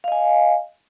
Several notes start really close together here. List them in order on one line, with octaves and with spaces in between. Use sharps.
F5 D#5 G#5